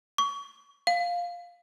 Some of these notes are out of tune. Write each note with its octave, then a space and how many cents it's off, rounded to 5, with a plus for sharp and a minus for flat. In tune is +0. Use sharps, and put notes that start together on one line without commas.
C#6 +30
F5 +5